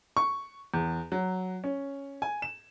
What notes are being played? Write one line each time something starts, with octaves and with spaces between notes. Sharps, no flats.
C#6
E2
F#3
C#4
G#5
E7